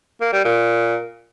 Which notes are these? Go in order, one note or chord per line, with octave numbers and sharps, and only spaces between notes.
A#3
G3
A#2